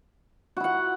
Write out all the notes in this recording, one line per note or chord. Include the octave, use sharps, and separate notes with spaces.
E4 F#4 F#5